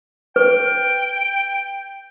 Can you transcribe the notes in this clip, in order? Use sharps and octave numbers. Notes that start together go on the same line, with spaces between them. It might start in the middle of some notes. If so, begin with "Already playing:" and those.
B4 G5